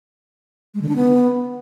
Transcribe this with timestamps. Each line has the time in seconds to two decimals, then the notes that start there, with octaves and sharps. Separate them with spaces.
0.74 G#3
0.82 D3
0.89 D4
0.96 B3